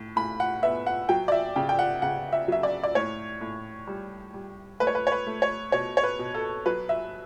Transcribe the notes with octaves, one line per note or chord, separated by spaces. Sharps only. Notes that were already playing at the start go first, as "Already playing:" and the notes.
Already playing: A2
A2 B5
F#5
B3 E5
F#5
F#3 G5
D5
E5
C#3 G5
G5
F#5
C#3 F#5
E5
F#3 E5
D5
D5
A2 C#5
A2
G3
G3
A3 B4
C#5
B4
C#5
B4
A3
C#5
B2 C#5
C#5
B4
B2
A4
F#3 B4
E5